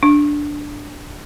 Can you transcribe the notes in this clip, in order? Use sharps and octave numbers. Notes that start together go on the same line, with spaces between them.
D4